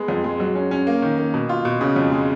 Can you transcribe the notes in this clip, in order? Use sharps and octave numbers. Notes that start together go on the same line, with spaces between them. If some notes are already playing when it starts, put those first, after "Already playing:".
Already playing: G#3 B3
F2
G#3
F#3
C#4
C#4
A#3
D#3
A#3
B2
F4
B2
C#3
F2
G#3